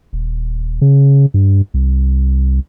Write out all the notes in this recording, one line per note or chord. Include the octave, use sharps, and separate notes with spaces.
D#1
C#3
G2
C2